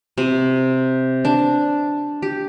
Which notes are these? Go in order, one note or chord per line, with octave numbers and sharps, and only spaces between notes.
C3
D4
G4